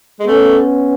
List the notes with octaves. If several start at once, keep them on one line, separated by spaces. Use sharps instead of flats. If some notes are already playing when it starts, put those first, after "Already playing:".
G#3
A3 B3 C#4